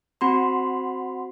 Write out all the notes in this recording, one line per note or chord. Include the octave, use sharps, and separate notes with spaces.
C4 F#4 B5 C6